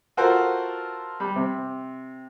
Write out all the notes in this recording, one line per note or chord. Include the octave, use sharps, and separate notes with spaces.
F4 F#4 A4 A#4 C5 F#5
G3
C3